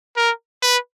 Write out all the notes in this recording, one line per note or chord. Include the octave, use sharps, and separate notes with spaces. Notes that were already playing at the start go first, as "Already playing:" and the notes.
A#4
B4